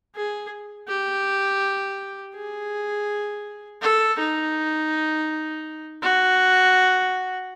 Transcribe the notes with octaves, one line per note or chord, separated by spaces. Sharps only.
G#4
G4
G#4
A4
D#4
F#4